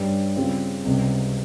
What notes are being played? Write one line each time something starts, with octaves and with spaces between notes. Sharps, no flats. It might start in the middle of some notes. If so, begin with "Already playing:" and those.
Already playing: G2 G3 C#4
C#3 G3 C4 F4
C#2 C3 G3